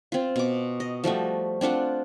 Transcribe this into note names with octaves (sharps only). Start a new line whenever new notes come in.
C4 F4
B2 D6
D#5
F3 G3 A3 F#4
C4 D4 F4 F#5